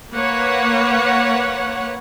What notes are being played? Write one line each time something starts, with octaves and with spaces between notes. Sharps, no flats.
A#3 B4 C#5 F#5